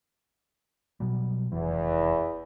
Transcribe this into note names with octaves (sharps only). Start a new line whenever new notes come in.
B2 F#3 G3
F1 E2 E3